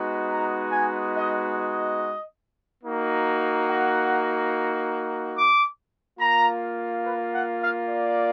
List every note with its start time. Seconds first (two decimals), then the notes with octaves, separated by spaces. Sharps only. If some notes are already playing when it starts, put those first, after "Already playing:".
Already playing: G#3 B3 D#4 F#4
0.30 A#5
0.72 G#5
1.14 D#5
1.56 D#5
2.83 A#3 D#4 F#4
3.67 F#5
5.35 D6
6.19 A#3 F4 A#5
7.04 B4
7.31 F#5
7.59 F5
7.88 D5